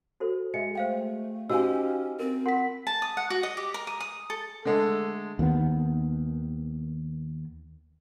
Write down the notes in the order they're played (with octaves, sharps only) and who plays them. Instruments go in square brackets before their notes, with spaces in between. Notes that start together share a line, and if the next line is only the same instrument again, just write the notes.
[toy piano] F#4 A4 C5
[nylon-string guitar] G#3 [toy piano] D#5 E5 [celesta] C#7
[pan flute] A3 [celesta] C5 F5 G5
[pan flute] C#4 [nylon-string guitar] D#4 G4 C5 [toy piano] F#4 F5 G#5 [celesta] E6
[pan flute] C4 [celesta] A#4
[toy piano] F4 A#4 C6 [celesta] F#5 B6
[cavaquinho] A5
D#6
F#5
F#4
D#5
G4
A#4
D#6
D#6
A4
[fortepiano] D3 G#3 A3 [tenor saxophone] A4
[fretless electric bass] D#2 D#3 A3 B3